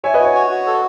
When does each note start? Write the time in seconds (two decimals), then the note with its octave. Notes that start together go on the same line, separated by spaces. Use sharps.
0.04 C#5 E5 G#5
0.14 B4 D#5
0.20 F#4 C#5
0.35 C#5
0.50 F#4
0.66 A4